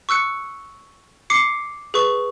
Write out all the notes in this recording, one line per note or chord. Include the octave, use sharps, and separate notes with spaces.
C#6 E6 F#6 C#7
D6 C7 C#7
G#4 B4 C#6